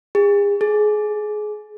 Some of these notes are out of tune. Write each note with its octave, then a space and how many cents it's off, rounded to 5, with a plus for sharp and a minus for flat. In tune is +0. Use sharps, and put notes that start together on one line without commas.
G#4 -40
G#4 +25